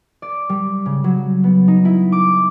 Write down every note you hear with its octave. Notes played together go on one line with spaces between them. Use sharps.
D5
G3
C#3
F#3
B3
D#4
E4
D6